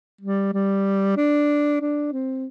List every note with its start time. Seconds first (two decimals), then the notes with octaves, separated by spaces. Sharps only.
0.21 G3
0.53 G3
1.17 D4
1.81 D4
2.12 C4